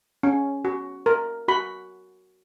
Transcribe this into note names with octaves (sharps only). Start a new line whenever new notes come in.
C#4
F#4
A#4
F#4 B5